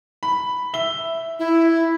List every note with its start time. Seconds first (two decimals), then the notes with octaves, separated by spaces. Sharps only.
0.23 B5
0.74 E5 G7
1.39 E4